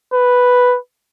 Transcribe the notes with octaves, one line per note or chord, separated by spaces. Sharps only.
B4